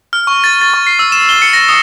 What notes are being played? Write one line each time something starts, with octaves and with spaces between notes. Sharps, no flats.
F6
C#6
A6
A6
C#6
C7
E6
E7
G7
C#7
A#6
D#6